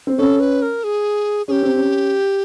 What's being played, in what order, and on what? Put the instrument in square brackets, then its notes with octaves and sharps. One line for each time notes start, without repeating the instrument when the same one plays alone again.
[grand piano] C4
[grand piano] C#4 [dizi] A4
[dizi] B4
A#4
G#4
[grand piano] C#4 [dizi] G4 G#4
[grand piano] C4
C#4